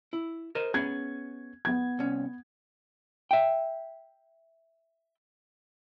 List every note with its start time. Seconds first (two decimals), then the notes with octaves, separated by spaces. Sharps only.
0.13 E4
0.55 A#4 C5 D#5
0.74 B3 C#4 G#4 G#6
1.65 B3 G#6
1.99 C2 C#4
3.31 E5 G5